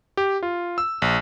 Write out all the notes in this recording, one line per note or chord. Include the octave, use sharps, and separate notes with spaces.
G4
F4
E6
A#1